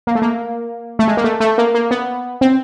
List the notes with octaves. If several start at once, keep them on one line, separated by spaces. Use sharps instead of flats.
A#3
A3
A#3
A3
G#3
A#3
A3
A3
A#3
A#3
B3
C4